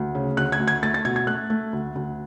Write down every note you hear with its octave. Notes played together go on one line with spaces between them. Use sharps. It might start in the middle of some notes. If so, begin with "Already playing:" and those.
Already playing: D2
C#3
D2 F#6
G#6
D2
G#6
A3 A6
A6
B2 G#6
G#6
A3 F#6
A3
D2
D2